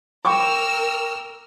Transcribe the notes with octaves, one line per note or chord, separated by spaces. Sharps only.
A#4 G5 C#6 D6 E6 F6